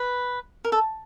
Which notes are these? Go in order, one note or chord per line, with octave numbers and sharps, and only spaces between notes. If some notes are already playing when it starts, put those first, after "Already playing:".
Already playing: B4
A#4
A4